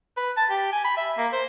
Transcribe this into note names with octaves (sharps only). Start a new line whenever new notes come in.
B4
A5
G4
G#5
B5
E5
A#3
C5